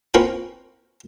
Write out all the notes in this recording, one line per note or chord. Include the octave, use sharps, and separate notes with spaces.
A#3 C4 C#4 F4 A#4 B4